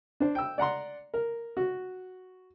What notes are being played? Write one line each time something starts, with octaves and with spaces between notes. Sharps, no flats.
D4 C5
G5 E6
D5 F#5 A#5 C6
A#4
F#4